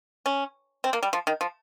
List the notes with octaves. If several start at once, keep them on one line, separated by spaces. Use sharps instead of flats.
C#4
C4
A#3
G3
F3
D#3
F3